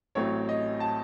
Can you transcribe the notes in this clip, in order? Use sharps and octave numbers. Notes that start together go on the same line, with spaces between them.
A1 A2 F#3 A3 C4 C#5
D#5
A5